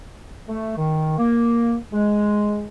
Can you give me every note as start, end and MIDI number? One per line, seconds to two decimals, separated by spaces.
0.48 0.73 57
0.77 1.14 51
1.18 1.75 58
1.92 2.68 56